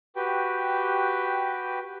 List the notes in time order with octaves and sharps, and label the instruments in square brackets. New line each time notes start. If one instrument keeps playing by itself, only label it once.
[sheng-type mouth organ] F#4 G4 B4 G5